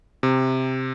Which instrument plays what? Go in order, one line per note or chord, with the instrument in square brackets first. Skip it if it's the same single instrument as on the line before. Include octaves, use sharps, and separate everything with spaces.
[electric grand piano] C3